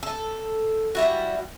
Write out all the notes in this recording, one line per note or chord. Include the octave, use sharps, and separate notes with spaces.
A4
G3 E4 F#4